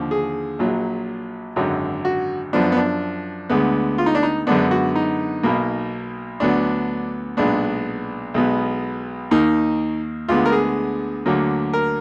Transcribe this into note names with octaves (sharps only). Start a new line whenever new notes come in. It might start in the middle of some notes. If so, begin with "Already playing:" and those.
Already playing: D#2 D3 F3
G#4
A#1 A#2 F#3
G#1 F#2 D3 F#3
F#4
F#2 F3 B3 D4
B3
D4
D2 D3 G#3 B3
F4
D#4
D4
D#4
F#2 D3 G#3 B3 D4
F#4
D#4
B1 B2 A#3
D2 D3 F#3 B3 D4
B1 A#2 G#3 B3 D4
B1 B2 G#3 B3
D#2 D#3 A#3 D#4
D2 D3 G#3 B3 F4
A#4
G#4
D2 D3 F#3 A#3
A#4